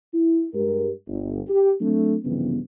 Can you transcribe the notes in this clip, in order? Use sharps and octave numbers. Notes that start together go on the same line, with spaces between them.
E4
G2 G#3 G4 A#4
G1
G4
F#3 A3 C4 D4
C2 G2 C#3 E3 F3 B3